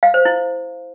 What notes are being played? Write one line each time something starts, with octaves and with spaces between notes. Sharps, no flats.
F5
C5
E4